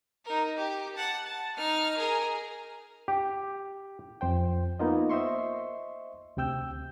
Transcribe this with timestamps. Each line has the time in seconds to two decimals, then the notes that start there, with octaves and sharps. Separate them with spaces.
0.25 D#4 A#4
0.57 G4
0.96 F#5 A5
1.26 A5
1.56 D#4 F6
1.97 G#4 A#4
3.08 G4
4.21 F2 C5 G5
4.79 A#3 B3 D#4 F4 D#5
5.10 C5 D#5 E5 C6 C#6
6.37 D2 C3 G5 E6 G6